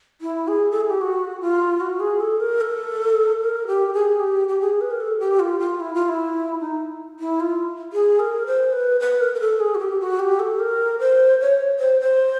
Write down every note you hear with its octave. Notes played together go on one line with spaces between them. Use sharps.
E4
G#4
A4
G#4
G4
F#4
F4
F#4
G#4
A4
A#4
A4
A#4
G4
G#4
G4
G4
G#4
B4
A#4
A4
G4
F4
F4
E4
F4
E4
D#4
E4
F4
G#4
A#4
C5
B4
B4
A#4
A#4
A4
G#4
F#4
G4
F#4
G4
A4
A#4
C5
C#5
C5
C5